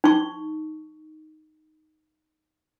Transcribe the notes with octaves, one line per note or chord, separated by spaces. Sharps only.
D#4 C#6